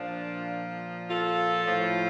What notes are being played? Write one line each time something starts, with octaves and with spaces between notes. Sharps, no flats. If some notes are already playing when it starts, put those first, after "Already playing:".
Already playing: A#2 F3 D4 F4
F4 A4
A2 F3